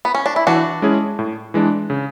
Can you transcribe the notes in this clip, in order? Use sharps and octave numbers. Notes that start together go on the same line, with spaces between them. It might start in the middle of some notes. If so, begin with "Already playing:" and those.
B3
C#4
D4
E4
E3 D4 F#4
G#3 C#4 E4 G#4
A2
E3 G#3 D4
C#3